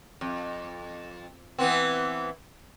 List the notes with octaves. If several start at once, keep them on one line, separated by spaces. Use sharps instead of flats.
F2
E3 B3 C4